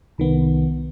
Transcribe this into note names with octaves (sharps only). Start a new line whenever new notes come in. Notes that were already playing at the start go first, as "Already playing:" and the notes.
C2 D#3 B3